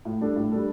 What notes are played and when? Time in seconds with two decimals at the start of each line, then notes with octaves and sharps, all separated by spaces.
0.05 A2
0.21 G3 D4 A4
0.36 A2
0.51 G3 D4 A4